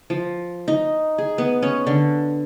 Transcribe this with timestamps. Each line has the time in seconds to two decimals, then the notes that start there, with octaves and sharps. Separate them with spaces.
0.10 F3
0.68 D#4
1.18 G#4
1.38 B3
1.62 C#4
1.87 D3